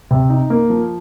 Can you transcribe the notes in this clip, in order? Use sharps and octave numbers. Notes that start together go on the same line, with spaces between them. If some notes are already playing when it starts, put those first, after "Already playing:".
C3
D#4
A#3
F3